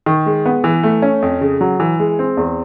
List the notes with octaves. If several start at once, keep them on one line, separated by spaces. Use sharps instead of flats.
D#3
G#3
B3
E3
A3
C#4
F2
C#3
F#3
E3
G#3
C4
E2